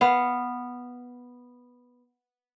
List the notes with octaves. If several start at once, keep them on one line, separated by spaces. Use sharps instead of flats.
B3 F5